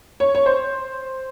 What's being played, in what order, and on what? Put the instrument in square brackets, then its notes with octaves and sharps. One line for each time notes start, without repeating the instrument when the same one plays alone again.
[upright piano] C#5
C#5
C5